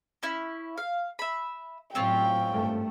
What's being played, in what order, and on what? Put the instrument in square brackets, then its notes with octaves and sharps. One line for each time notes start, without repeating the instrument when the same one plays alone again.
[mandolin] C#4 E4
F5
E5 B5
[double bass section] A2 F#3 [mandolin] C4 C#4 F4 [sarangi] G5
[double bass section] G#1 G2 A3